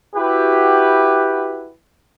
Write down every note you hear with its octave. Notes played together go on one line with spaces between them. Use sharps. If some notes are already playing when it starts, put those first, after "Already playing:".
E4 F#4 G4 B4